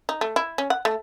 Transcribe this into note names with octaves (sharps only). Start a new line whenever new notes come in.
D#4
A3
E4
C#4
F#5
A3